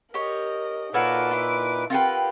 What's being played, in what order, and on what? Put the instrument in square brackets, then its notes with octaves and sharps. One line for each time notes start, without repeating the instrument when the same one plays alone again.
[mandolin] G4 C#5 [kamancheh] A#4 D#5
[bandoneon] A#2 B4 [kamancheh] D#4 D6 [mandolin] F4 F#4 A4 [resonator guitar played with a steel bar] C#5
[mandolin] E4 C6
[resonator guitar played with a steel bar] C4 F#5 G5 [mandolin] F4 B4 [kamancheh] G4 A#4